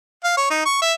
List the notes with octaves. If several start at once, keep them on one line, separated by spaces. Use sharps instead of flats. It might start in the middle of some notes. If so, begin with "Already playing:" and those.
F5
C#5
D#4
C#6
E5